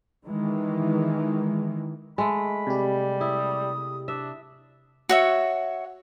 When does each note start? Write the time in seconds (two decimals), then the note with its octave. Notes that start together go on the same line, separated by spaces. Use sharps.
0.25 D#3 E3 G#3
2.18 G#3 A3 B5
2.67 C3 G3 G4
3.21 E4 D#6
4.08 D4 E5
5.09 F#4 C#5 E5